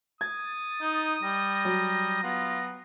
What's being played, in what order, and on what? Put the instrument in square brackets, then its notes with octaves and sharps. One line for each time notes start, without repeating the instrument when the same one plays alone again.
[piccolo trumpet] D#6 [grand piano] G#6 [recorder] A6
[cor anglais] D#4
[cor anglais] G3 [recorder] A#6
[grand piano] F#3
[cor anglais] B3 [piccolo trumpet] F4